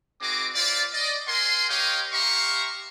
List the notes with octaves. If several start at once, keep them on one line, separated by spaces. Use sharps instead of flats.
C4 D#4 F#4 G#4 D6
F4 B4 C5 D5
D5 D#5
A#4 F#5 G#5 C6
G4 A#4 C#5 D#5 F5 G5
G4 E5 F5 A#5 C6 C#6